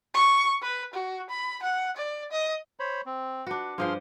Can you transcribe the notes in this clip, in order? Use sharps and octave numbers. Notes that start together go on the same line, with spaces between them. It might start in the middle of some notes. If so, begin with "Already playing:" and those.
C#6
B4
F#4
B5
F#5
D5
D#5
C5 C#5 B5
C4
D4 F#4 B4
G2 F3 G#4 C5 C6 F6